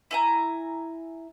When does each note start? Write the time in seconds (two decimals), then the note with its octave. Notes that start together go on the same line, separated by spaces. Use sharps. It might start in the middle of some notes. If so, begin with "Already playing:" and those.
0.11 E4 G#5 A#5